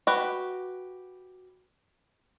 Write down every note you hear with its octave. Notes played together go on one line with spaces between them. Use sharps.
F#4 G4 B4 G5